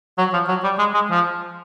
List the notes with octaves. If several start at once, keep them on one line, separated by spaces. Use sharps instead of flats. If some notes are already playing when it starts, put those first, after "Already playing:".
F#3
F3
F#3
G3
G#3
G#3
F3